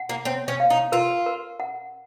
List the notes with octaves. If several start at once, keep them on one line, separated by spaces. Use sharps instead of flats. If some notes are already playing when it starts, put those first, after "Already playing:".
Already playing: F#5
A#3
C4 C#5
C#4
F5
D#4
F4 A#4
A#4
F#5